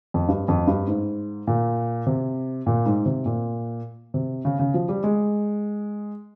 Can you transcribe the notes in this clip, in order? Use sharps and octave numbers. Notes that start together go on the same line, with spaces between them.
F2
G2
F2
G2
G#2
A#2
C3
A#2
G#2
C3
A#2
C3
C#3
C#3
F3
G3
G#3